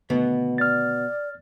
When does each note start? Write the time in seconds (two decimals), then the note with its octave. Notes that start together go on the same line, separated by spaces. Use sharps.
0.10 B2 D3 D#3 A3 B3 D#5
0.58 D5 F6 A6